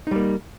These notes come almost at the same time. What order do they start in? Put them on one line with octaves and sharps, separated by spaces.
D#4 G3 A#3